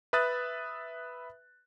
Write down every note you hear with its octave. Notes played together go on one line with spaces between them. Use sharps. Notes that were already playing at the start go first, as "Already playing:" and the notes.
B4 E5 D#6 F#6 A6